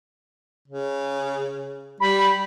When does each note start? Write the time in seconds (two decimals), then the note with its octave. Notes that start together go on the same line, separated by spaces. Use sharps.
0.68 C#3
2.00 G3 B5